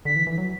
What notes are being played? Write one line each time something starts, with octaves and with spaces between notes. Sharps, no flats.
D3 B6
E3
E3
F#3